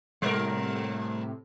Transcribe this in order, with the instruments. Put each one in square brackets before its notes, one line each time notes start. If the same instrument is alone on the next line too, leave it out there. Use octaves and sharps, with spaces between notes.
[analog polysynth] A2 C3 [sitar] G3 A#4